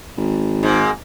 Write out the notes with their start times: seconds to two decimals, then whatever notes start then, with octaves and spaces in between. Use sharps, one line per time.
0.17 G#1
0.63 G#2 A#3